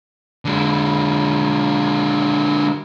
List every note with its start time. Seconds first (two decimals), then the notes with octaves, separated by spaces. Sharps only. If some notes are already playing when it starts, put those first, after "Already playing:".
0.45 D3 G#3